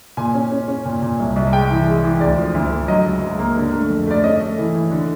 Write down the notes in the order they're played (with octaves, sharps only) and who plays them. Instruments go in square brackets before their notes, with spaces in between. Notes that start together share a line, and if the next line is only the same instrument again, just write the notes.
[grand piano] A#2 G#5
C#4
C#4
C#4
A#2
A#2
C2
C2
G#3 G5
E3
G#3
E3
D2 D5
F3
D2
D2
F#3 D#5
C#2
C#2
A#3
D3
A3
F2
A3 D5
C#4 D#5
A3
E3
E3
D3